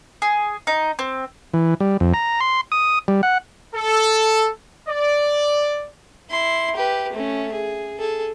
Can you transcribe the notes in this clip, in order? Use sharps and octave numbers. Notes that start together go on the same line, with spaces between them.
G#4
D#4
C4
E3
G3
F2
A#5
C6
D#6
G3
F#5
A4
D5
E4 C6
G4 B4
A3 C#4
G#4
G#4 A4